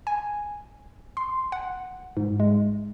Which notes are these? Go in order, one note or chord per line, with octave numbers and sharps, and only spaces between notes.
G#5
C6
F#5
G#2
G#3